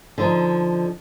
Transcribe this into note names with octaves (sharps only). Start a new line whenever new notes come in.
D3 F3 D#4